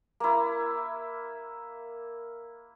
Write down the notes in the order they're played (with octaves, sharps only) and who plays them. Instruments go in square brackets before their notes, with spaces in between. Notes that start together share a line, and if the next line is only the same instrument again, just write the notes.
[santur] A#3 E4